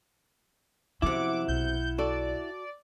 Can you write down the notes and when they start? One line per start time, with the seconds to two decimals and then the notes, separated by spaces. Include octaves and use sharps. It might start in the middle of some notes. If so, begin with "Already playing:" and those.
1.02 F#2 C3 F3 B3 E4 F#5 D6
1.48 B1 G6
1.98 F#4 A4 D5